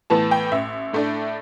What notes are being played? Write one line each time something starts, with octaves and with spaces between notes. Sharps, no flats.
A2 E3 B3 A5
G5
A1 E5
A2 A3 D4